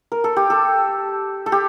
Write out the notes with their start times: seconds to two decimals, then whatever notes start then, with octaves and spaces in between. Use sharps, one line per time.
0.12 A#4
0.24 A4
0.36 G4
0.50 A4
1.46 A4
1.52 G4